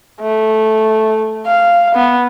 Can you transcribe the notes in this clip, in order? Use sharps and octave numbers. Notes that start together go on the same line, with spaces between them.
A3
F5
B3